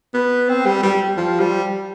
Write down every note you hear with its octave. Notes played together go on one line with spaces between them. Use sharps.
B3
C4
G3
G3
F3
G3